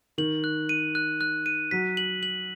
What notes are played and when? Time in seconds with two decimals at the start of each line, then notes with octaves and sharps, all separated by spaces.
0.18 D#3 F#7
0.44 F#6
0.69 D#7
0.95 F#6
1.21 F#6
1.46 D#7
1.71 F#3 B6
1.97 F#7
2.23 F#7